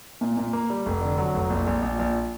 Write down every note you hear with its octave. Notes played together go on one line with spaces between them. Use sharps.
A#2
A#2
A#3
G3
F1
D3
F#3
F1
A#1
A#1
A#1
A#1